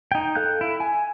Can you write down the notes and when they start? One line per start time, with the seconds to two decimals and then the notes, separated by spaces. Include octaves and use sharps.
0.12 D#4 G5
0.35 A4 F5 F#6 G6
0.61 E4
0.80 G#5